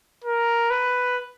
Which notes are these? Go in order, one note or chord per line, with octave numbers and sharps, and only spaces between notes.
A#4
B4